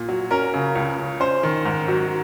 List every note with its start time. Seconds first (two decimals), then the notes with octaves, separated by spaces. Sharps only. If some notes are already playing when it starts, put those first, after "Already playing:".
Already playing: A#2
0.08 F#3
0.31 C#4 A#4
0.54 C#3
0.75 C#2
0.98 C#3
1.20 C#4 C5
1.43 D#3
1.65 G#2
1.88 F#3